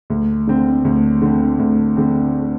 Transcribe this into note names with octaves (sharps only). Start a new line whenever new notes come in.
D2
D3 C4
D2
D3 C4
D2
D3 C4